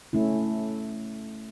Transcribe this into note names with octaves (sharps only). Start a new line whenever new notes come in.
A3 C#4 E4